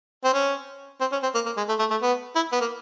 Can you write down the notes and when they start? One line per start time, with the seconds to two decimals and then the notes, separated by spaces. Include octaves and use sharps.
0.24 C4
0.33 C#4
1.00 C4
1.12 C#4
1.22 C4
1.34 A#3
1.46 A#3
1.57 G#3
1.68 A3
1.79 A3
1.90 A3
2.01 B3
2.35 E4
2.52 B3
2.60 A#3